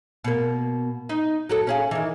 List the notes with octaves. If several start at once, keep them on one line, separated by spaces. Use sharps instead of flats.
B2 A#3
D#4
F#3 F#4 A4
C#4 G#4 F5
D#3 E3